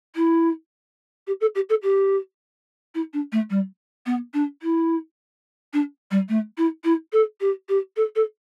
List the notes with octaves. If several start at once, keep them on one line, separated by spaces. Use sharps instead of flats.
E4
G4
A4
G4
A4
G4
E4
D4
A3
G3
B3
D4
E4
D4
G3
A3
E4
E4
A4
G4
G4
A4
A4